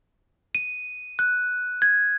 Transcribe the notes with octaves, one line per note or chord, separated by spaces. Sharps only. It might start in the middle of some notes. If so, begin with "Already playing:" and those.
D#7
F#6
G#6